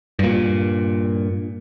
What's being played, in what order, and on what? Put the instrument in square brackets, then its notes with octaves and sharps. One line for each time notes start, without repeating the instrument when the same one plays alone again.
[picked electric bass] G2 A#2